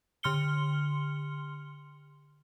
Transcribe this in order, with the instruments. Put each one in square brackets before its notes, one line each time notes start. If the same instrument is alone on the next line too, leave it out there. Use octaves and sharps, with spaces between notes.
[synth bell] D3 C6 F6 C#7 G7